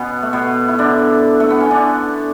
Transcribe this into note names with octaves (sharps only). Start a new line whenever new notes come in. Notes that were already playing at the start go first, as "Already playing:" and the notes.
Already playing: B2 B3 C#4
A3
B2 B3
E4
D3 D4
A3
B3
C#4
D3 D4